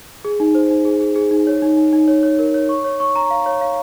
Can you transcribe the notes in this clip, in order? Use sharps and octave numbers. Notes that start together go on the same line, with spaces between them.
G#4
D#4
C5
D#4
G#4
G#4
G#4
D#4
C#5
D#4
D#4
D#4
C#5
C#5
A#4
C#5
C#6
C#5
C#6
A#5
F5
C#5
F5